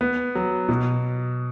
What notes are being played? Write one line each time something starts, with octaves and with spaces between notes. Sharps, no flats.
B3
F#3
B2